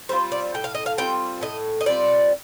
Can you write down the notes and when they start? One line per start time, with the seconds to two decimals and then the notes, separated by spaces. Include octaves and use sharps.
0.09 G3 C4 F4 C5
0.32 D5
0.54 A2 G5
0.64 F5
0.75 D#5
0.86 F5
0.98 G3 C4 F4 G5
1.41 A2 D#5
1.81 D#5
1.86 G3 C4 F4 D5